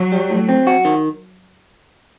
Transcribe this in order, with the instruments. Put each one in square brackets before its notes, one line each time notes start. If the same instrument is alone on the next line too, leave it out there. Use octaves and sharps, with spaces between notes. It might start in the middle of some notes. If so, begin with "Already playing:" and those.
Already playing: [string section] F#3
[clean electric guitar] G3
A2
C4
F#4
D#3